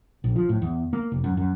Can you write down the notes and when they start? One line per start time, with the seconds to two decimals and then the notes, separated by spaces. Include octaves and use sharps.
0.24 A#1
0.36 F3
0.49 A2
0.62 E2
0.93 A#3
1.12 F1
1.24 F#2
1.37 F#2